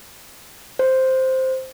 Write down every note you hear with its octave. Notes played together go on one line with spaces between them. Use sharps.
C5